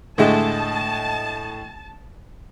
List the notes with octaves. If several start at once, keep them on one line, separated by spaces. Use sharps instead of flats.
A2 D3 G#3 A3 D#5 A5